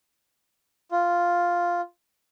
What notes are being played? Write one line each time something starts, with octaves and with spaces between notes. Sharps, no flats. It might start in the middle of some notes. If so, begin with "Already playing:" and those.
F4